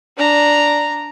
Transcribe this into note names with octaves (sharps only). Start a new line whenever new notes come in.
D4 A#5